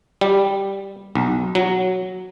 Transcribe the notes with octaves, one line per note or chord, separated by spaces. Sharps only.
G3
B1
F#3